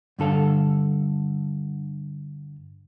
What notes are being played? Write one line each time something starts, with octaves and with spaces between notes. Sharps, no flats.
G2 D3 A4 F5